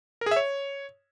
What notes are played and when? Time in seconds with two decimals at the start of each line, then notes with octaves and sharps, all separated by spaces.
0.21 A#4
0.26 G#4
0.31 E5
0.36 C#5